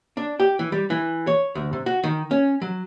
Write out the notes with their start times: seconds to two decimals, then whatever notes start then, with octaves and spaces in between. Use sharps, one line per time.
0.17 D4
0.40 G4
0.59 E3
0.72 G3
0.90 E3
1.27 C#5
1.55 D2
1.73 C3
1.86 F#4
2.03 D#3
2.31 C#4
2.62 F#3